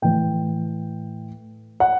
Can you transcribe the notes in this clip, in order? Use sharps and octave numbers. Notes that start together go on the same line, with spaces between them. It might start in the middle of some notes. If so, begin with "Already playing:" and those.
A2 E3 G5
F#5